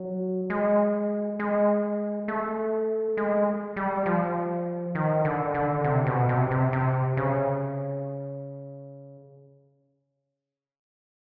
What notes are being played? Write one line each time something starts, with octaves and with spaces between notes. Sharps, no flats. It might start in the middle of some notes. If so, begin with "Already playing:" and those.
Already playing: F#3
G#3
G#3
A3
G#3
G3
F3
D#3
D3
D3
C3
B2
C3
C3
C3
C#3